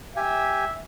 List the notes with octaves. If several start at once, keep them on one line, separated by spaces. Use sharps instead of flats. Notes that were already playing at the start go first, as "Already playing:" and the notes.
G4 E5 G#5